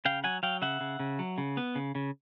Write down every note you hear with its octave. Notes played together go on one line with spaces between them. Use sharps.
C#3 F5 G5
F#3 F#5 G#5
F#3 F5 G5
C#3 E5 F#5
C#3
C#3
F#3
C#3
B3
C#3
C#3